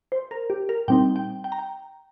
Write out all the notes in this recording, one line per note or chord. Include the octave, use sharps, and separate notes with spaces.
C5
A#4
G4
A#4
A#2 G3 C4 D#4 G5
G5
G5
A#5
G5